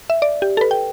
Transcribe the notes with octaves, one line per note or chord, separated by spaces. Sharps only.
E5
D5
G4
A4
B4
G5